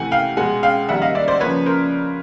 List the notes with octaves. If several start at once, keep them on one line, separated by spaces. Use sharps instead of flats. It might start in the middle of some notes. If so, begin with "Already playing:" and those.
Already playing: C3 E3 A3 F#5 G#5
F5 G5
B2 G#3 F#5 G#5
F5 G5
D#3 G3 A#3 E5 F#5
D#5 F5
D5 E5
C5 D5
C#3 F3 A#3 B4 C#5
A#4 C5